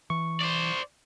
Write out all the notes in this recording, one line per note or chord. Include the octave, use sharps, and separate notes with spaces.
E3 C#6
C5 D5